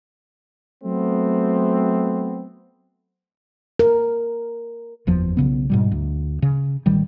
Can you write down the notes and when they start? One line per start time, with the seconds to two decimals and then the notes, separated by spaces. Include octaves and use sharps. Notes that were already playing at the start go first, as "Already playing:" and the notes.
0.84 F#3 A3 B3 C4
3.79 A#4
5.07 F#1 E2 F3
5.37 B1 C#3 B3
5.70 G#2 B2 G3
5.92 D2
6.42 C#3
6.86 A1 D#3 G3